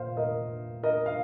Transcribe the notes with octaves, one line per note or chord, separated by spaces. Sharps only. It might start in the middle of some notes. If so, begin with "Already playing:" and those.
Already playing: A#2 A#3 C5 F5
A#4 D#5
A#4 D#5
F5